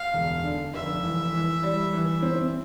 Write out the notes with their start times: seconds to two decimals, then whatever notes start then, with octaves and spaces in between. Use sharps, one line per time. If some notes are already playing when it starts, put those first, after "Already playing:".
Already playing: F5
0.13 E1
0.44 D3
0.74 F1 E5
1.03 E3
1.33 E3
1.63 G3
1.93 E3
2.22 C4